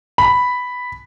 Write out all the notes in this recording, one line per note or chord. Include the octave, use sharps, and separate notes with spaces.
B5